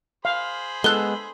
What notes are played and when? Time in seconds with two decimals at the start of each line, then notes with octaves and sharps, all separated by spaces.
0.25 G#4 C5 F5 B5
0.84 G#3 B3 A4 F#6 G7